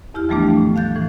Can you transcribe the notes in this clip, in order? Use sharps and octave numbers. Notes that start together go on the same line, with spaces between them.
E2 E4 G4 F6
E3 F3 G3 A3 B3 D4
D#3 A3 F5
A2
F5 F#6 G6 A6
A2 E3